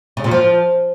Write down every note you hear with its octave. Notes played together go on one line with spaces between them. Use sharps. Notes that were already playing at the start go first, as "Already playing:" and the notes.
C#3
A#2
F3